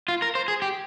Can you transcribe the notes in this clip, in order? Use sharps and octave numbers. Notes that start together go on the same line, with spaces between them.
F4
A#4
C5
G#4
G4